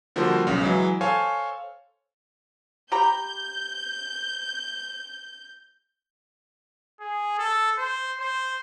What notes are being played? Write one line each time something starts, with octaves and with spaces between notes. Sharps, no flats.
D3 F3 G3 A#3 F#4 C5
B1 C#3
E3 F#3 G#3
A4 C5 C#5 F5 G#5
G4 A#5 B5 G6
G#4
A4
C5
C5